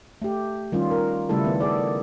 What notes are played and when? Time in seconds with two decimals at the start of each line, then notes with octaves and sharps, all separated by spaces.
0.22 A3 G4
0.72 D#3 G3 C#4 F4
0.91 A#4
1.29 C#3 G3 A3 E4 A4
1.44 D#3 B3
1.61 G#4 A4 D5